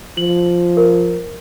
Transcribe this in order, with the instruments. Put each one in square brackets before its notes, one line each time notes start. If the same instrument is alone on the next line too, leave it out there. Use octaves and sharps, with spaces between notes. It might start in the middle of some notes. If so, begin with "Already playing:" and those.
[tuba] F3 [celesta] F#7
[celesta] A#4